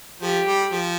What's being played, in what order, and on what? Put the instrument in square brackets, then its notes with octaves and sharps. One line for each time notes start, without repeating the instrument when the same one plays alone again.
[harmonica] F3 [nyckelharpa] G4
[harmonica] G3
F3